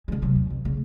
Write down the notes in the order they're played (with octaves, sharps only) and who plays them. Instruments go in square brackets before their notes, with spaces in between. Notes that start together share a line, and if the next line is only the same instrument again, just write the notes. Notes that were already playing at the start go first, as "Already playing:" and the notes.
[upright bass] D3 G#3
C3 F#3
D#2
F2
C#3 A3